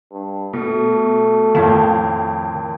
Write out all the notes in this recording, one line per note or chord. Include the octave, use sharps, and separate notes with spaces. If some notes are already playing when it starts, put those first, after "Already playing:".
G2
B2 A3
A1 F2 D#3 F5